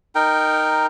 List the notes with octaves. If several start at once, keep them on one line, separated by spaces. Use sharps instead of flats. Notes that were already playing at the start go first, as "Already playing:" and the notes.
D#4 A#4 G5